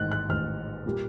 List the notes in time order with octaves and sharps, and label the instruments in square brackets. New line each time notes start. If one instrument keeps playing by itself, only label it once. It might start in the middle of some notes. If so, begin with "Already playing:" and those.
Already playing: [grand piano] A1 G#2 D#3 F#6
F#6
A1 G#2 D#3 F6
A#2 G3 A#3